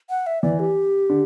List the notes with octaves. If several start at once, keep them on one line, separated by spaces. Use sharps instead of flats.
F#5
E5
E3 D5
G4
D3